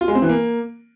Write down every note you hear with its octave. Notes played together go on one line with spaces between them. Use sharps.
F4
G#3
C4
E3
A#3